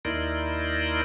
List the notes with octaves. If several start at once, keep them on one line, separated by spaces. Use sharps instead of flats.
D#2 D#4 E4 A#4 D5 C6